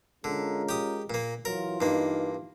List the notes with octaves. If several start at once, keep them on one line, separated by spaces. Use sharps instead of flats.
D3 G#3 C#4 F4 A#4
G4 D#6
A#2 A#3
E3 F#3 F4 A#4
G2 A#3 D#4